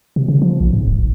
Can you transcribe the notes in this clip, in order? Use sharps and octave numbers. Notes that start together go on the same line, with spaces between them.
C3
C#3
F3
A#1
G#2
D1
A1